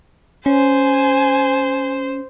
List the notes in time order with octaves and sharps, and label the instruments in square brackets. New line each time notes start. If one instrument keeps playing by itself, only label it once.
[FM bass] C#4 [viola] C5 [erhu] G#5